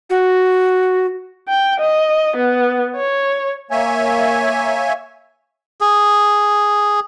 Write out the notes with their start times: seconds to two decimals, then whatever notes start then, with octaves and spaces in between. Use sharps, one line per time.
0.10 F#4
1.48 G5
1.80 D#5
2.37 B3
2.96 C#5
3.71 A#3 C#5 E5 G#5
5.81 G#4